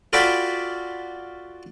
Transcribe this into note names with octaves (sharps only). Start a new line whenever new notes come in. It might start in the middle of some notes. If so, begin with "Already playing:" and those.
F4 F#4 A4 D5 G5 B5